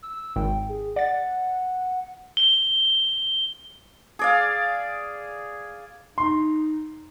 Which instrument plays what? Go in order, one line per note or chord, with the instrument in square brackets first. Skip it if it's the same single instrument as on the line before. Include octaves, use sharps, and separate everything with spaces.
[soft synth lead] E6
[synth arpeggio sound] G#1 [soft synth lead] G5
[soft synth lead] G#4
[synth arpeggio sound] D5 A6 [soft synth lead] F#5
[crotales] G7
[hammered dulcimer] G#4 D5 F5
[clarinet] D#4 [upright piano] C6